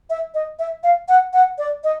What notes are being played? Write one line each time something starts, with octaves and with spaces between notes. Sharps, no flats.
E5
D#5
E5
F5
F#5
F#5
D5
D#5